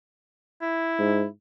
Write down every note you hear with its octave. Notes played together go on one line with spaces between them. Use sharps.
E4
G#2